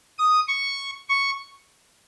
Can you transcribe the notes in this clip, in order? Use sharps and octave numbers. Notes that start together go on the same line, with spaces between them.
D#6
C#6
C#6